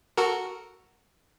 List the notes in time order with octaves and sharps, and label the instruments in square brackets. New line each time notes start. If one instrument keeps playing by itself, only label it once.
[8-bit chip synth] F#4 A4 A#4